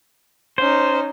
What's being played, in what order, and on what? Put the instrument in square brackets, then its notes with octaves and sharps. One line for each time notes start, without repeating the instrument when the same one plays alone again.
[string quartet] C#4 D#4 [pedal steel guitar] C5